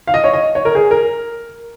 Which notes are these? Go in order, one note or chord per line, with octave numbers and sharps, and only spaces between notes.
F5
D#5
C#5
D#5
C#5
A#4
G#4
A#4